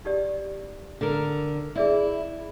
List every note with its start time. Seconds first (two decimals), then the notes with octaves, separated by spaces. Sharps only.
0.05 D#4 G4 D5
1.01 D3 A#4
1.76 E4 G#4 D5 E5